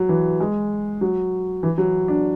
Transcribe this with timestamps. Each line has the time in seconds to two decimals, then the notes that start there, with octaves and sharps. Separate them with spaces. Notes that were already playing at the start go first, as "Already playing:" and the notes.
Already playing: F#3
0.09 E3
0.40 G#3
1.01 F#3
1.63 E3
1.78 F#3
2.08 D4